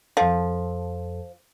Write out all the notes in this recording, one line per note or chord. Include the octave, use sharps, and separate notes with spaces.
F2 F3 A4